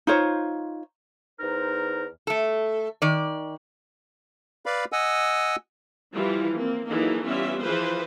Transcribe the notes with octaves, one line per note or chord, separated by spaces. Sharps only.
D#4 F4 C5 C#5
E2 D#4 A#4 C5
A3 A4
D#3 D5
B4 D5 F5 B5
D#5 F#5 G#5 E6
E3 F3 G3 E4 F4
A#3 C4
E3 F#3 A#3 D#4 G#4 A4
E3 G3 B3 C#4 F4 E5
E3 F3 F4 G#4 B4 C5